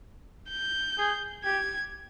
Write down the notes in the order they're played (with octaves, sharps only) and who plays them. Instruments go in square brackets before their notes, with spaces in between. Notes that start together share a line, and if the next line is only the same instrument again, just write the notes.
[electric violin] G6
[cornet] G#4
[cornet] G4 [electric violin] G#6